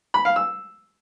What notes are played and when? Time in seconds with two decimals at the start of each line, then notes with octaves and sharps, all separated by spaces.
0.14 B5
0.25 F5
0.36 E6